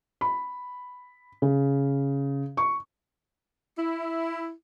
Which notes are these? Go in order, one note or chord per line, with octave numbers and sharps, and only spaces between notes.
B5
C#3
C#6
E4